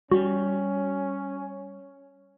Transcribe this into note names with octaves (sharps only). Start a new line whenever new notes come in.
G3 C#4 F#4